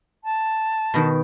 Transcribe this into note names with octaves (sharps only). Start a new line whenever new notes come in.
A5
B2 D#3